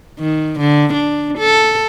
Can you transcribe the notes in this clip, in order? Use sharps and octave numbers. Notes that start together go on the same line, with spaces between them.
D#3
D3
D4
A4